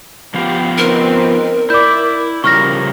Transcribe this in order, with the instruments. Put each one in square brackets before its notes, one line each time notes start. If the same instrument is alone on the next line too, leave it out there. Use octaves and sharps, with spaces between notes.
[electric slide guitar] F3 B3 F5 [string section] G4
[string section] C4 D#4 B4 [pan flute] A#4
[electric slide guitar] E4 [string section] D5 [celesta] D6 G6
[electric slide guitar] C#3 F3 G3 [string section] A#4 [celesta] C#6 F6 A#6